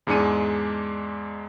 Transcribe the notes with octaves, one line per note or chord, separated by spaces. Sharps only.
E2 G#2 G#3 D4 C#7 D#7